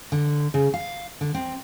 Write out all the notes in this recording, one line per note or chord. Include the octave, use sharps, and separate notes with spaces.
D3
C#3
F5
D3
C4